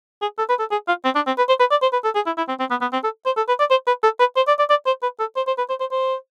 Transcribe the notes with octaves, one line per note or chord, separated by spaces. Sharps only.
G#4
A4
B4
A4
G#4
F4
C4
D4
C4
B4
C5
B4
D5
C5
B4
A4
G#4
E4
E4
C4
C4
B3
B3
C4
A4
C5
A4
B4
D5
C5
B4
A4
B4
C5
D5
D5
D5
C5
B4
A4
C5
C5
B4
C5
C5
C5